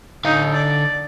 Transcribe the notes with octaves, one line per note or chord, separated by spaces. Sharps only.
D3 D#4 F5
D5